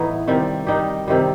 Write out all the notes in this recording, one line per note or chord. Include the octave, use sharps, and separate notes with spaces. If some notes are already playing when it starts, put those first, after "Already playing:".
Already playing: A2 E3 B3 D#4
C3 D#3 G3
D#3 G3 D#4 G4
C3 D#3 G3